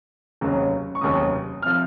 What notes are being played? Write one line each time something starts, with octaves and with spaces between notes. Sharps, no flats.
F1 D#2 C#3 F#3
C#6
F1 D#2 C#3 F#3 D#6
C3 F3 F6